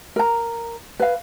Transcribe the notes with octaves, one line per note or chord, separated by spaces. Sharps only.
A#4 A#5
B4 F5